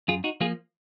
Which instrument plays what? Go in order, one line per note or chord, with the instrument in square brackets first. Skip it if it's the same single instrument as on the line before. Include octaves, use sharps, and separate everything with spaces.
[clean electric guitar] F#2 F4 G#4
D#4 F#4
F3 A#3 F4 G#4